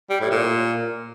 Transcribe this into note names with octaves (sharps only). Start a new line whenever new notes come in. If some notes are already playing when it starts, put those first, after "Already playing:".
G3
A2
A#2